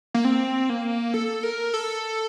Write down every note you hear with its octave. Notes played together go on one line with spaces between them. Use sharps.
A#3
C4
A#3
A4
A#4
A4